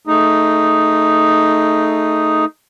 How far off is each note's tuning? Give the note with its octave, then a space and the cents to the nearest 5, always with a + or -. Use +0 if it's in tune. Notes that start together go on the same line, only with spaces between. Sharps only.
A3 +10 D#4 +0 G#4 +0